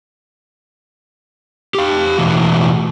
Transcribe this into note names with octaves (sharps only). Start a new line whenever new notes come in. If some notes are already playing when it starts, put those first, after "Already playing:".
G4 F5
B2 E3 A3 F#4